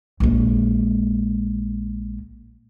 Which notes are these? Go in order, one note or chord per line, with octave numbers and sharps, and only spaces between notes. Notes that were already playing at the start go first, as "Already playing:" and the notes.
A#1 G#3